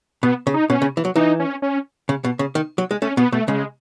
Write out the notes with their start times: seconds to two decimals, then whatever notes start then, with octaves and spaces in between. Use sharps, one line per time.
0.23 B2 B3
0.47 C#3
0.54 D#4
0.70 B2 C#4
0.82 C#3
0.97 E3
1.05 F#3
1.16 E3 D#4
1.40 C#4
1.62 C#4
2.09 C#3
2.24 B2
2.39 C#3
2.55 D#3
2.78 F#3
2.91 G#3
3.02 A3 C#4
3.17 B2 B3
3.32 B2 A3
3.48 C#3 G#3